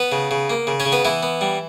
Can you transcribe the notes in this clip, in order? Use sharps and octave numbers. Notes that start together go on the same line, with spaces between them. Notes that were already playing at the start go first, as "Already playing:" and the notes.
Already playing: B3 B4
C#3
C#3
A#3
C#3
C#4 C#5
C#3
B3 B4
E3 B3 E4
B3
G3